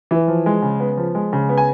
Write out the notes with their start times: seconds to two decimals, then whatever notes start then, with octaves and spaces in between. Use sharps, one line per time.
0.11 E3
0.28 F3
0.46 G#3
0.62 C#3
0.80 B3
0.97 F3
1.15 G#3
1.33 C#3
1.49 B3
1.57 G#5